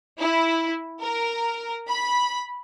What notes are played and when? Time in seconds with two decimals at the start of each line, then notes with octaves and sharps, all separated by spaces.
0.20 E4
1.00 A#4
1.88 B5